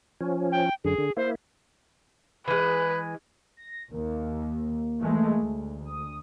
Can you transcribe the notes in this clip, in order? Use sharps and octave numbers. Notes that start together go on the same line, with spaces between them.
F3 C#4
G5
F#2 D3 G#4
D3
A#3 E4 C5
E3 G#3 B4
A#6
D#2 A#3
E3 G#3 A3
D2
D#6